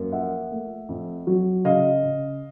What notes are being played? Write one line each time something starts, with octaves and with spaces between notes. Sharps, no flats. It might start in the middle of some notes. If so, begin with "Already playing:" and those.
Already playing: F#2 A#3
F3 E5 F#5
A3
F2
F#3
C#3 D#5 F5
C#3